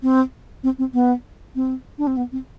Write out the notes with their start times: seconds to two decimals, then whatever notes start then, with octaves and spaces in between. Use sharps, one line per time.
0.02 C4
0.63 C4
0.78 C4
0.93 B3
1.55 C4
1.98 D4
2.07 C4
2.17 B3
2.32 C4